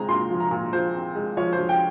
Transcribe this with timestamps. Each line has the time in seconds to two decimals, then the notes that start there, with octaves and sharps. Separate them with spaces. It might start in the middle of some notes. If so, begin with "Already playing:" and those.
Already playing: G#3 C4 A#5
0.09 A#2 C6
0.30 F3
0.40 A#5
0.51 A#2
0.72 F3 C5
0.94 C4
1.15 G#3
1.37 F3 C#5
1.53 C5
1.58 F3
1.69 G5